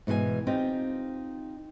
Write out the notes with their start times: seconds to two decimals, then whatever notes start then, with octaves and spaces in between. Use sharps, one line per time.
0.07 G#2 B2 E3 B4 G#5
0.47 C4 D#4 F4 G4